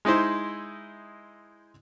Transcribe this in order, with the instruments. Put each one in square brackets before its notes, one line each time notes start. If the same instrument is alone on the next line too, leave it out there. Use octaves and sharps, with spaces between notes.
[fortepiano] G#3 D#4 E4 C5